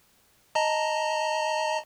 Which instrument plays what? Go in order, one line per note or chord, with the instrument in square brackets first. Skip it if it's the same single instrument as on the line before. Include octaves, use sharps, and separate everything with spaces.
[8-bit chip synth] D#5 A5 A#5